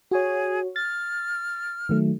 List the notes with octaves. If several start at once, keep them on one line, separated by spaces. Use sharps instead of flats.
F#4 G#4 C#5
F6 A6
D#3 F#3 A3